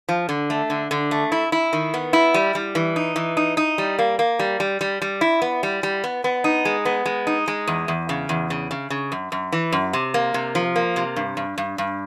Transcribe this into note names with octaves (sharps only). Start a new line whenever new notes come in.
F3
D3
A3
D3
D3
A3
E4
E4
D#3
B3
E4
G3
G3
E3
D#4
E3
D#4
D#4
G3
A#3
A#3
G3
G3
G3
G3
E4
B3
G3
G3
B3
B3
D#4
G#3
B3
G#3
D#4
G#3
E2
E2
C#3
E2
C#3
C#3
C#3
F#2
F#2
E3
F#2
C3
A#3
C3
F3
A#3
C3
G2
G2
G2
G2